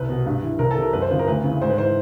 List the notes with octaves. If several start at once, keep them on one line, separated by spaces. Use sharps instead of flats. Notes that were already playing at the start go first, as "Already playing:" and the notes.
Already playing: C2 B4
B2
G2
E3
C2 A#4
A4
C3 E3
A#4
F#2 B4
C5
C#3 F3 B4
A#4
D2 B4
C#3 E3
G#2 C5
B4
E3 C5